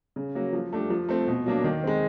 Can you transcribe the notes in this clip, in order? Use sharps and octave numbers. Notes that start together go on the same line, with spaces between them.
C#3
F#3 A#3
F3
A3 D4 G4
F3
A3 C4
B2
F#3 A#3 D4
D#3
G#3 C4